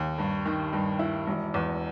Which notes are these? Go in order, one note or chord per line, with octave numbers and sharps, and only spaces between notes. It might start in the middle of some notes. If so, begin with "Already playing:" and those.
Already playing: D#2
G2
D#3
G2
E4
E1
E2